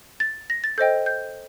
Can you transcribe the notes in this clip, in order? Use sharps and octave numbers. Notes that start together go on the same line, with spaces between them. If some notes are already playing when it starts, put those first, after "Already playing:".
A6
A#6
A6
A4 C5 D#5 G5 G6
G6